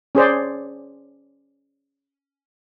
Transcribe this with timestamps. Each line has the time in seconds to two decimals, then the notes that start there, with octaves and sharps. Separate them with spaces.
0.15 C#4 G#4 C5 D5